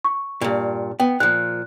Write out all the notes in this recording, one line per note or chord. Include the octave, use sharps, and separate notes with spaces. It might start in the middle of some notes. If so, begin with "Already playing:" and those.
C#6
G2 A#2
B3 G5
A#2 F3 F#6